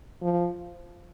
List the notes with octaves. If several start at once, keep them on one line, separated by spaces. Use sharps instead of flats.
F3